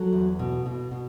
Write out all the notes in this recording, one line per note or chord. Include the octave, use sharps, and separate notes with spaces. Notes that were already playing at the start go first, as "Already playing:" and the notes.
Already playing: F#3 A4
E2
B2
B2
B2